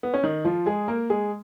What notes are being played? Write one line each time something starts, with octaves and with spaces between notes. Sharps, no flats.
B3
C#4
D#3 D#4
F3 F4
G#3 G#4
A#3 A#4
G#3 G#4